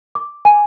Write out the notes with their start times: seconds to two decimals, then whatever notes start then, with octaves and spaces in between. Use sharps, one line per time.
0.15 D6
0.45 G#5